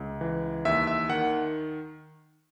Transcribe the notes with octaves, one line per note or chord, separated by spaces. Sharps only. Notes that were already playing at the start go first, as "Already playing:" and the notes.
Already playing: C#2
E3
D#2 E5
E5
D#3 F#5